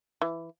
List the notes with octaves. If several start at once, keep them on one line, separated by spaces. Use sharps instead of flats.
E3